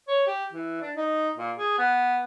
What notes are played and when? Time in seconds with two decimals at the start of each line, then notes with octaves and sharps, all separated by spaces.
0.08 C#5
0.27 G4
0.52 E3
0.81 D4
0.97 D#4
1.38 A#2
1.58 G#4
1.79 B3